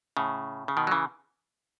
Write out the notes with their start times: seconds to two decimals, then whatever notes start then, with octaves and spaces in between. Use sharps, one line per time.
0.17 A2 C#3
0.68 C#3
0.77 B2 D#3
0.87 F#3
0.91 C#3 E3